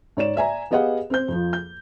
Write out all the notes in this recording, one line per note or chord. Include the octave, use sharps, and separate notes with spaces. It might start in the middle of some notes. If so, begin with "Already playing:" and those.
G#2 C#5 D5 E7
D5 E5 G#5 A#5
B3 G4 G#4 D#5 F5 F#5
C4 C5 G6
F2 F3
G6